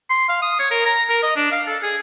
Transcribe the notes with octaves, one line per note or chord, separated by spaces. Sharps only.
C6
F5
D#6
C#5
A#4
A#5
A#4
D#5
D4
F5
A4
G#4